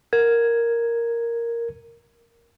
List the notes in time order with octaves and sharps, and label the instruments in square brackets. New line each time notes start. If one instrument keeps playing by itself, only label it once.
[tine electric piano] A#4 G#6